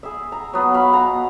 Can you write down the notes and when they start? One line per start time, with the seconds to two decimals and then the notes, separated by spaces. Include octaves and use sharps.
0.03 G#4 E5
0.32 A#5
0.53 F#3 B3
0.74 F#4 F5 B5
0.93 B2 A#5